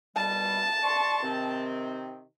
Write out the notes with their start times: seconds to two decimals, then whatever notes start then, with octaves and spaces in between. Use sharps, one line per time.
0.16 B2 G3 A5
0.83 D5 C6 C#6
1.23 C3 D#3 C4